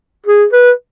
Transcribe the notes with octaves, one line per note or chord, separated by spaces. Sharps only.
G#4
B4